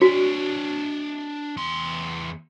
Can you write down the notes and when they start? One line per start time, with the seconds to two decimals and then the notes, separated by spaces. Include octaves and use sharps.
0.02 D4 F#4 C#5
1.57 E2 C6